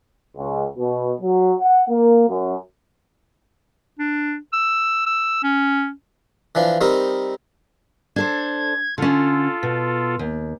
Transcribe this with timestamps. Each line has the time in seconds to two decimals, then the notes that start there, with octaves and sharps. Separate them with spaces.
0.37 C#2
0.77 B2
1.21 F#3
1.59 F#5
1.89 A#3
2.29 F#2
3.99 D4
4.53 E6
5.06 E6
5.43 C#4
6.55 E3 F3 D4
6.81 G3 C4 D#4 A#4
8.16 D4 A4 C5 G#6
8.98 D3 C#4 F4 A4
9.63 B2
10.19 D#2